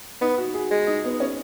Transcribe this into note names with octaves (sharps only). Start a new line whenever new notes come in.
B3 D#4
F#4
G#4
G#3
D#4
B3
C#4